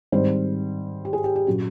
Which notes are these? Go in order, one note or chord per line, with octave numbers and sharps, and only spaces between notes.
G#2 D#3 G3 C4 C5
G4
G#4
G4
G4
A#2 F#3 A#3 C#4 F#4